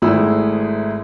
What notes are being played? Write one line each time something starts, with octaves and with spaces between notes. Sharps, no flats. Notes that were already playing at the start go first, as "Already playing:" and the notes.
G#1 G#2 A3 E4 G#4 E6